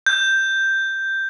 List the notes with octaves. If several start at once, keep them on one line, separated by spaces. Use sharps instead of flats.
G6